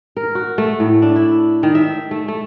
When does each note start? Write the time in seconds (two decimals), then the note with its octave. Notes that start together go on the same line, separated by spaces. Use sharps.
0.17 A#4
0.35 F#4
0.58 A3
0.80 A2
1.02 D4
1.16 E4
1.63 D#3
1.75 E5
2.11 A3
2.28 A3